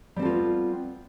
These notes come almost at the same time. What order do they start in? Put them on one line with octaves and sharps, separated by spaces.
G3 C4 A4 F4 B3